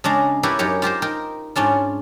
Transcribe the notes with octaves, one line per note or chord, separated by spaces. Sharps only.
C#3 G#3 D4 A#5
D4 E4 G4 A#4 B4 C#5
F#2 D#4 G4 A#4 C#5
F4 G4 A#4 C5
D#4 A#4 G5
G#2 C#4 D4 F4